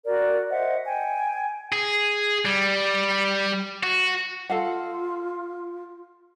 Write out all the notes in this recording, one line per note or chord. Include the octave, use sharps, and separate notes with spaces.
F#4 A#4 D5
C5 D#5 E5 F#5
G5 G#5
G#4
G3
F#4
F4 A4 F5 F#5